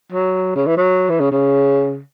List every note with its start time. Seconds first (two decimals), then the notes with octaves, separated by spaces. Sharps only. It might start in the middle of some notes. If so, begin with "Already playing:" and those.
0.12 F#3
0.55 C#3
0.67 E3
0.77 F#3
1.09 E3
1.20 C#3
1.31 C#3